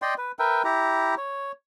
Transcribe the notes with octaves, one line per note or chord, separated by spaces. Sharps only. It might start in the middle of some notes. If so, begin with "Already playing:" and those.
D5 D#5 G5 C6
B4
A#4 B4 E5 G5
E4 G4 A#5
C#5